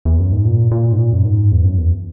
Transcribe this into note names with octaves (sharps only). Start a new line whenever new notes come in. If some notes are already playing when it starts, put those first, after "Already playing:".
E2
F#2
G#2
A#2
A#2
G#2
A#2
F#2
G#2
E2
F#2
E2